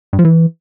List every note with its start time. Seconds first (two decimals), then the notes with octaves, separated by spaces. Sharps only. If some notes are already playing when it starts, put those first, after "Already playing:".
0.13 G2
0.19 F3
0.25 E3